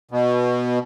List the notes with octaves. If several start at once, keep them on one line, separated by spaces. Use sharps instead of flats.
B2